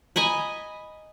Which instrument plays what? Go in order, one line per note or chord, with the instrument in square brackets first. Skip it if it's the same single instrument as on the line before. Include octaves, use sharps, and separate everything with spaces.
[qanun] D#5 G#5 A#5 B5